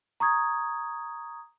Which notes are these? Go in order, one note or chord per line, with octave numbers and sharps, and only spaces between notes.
A#5 C#6 D#6 G#6